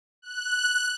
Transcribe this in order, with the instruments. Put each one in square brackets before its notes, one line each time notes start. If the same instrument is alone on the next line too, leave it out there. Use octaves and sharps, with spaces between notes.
[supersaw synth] F#6